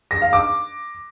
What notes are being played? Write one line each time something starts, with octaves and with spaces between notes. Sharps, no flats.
A#6
F5
D6